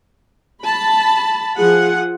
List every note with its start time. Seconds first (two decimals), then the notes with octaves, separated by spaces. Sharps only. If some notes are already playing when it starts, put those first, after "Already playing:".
0.61 A5 B5
1.59 F3 F4 G#4 F#5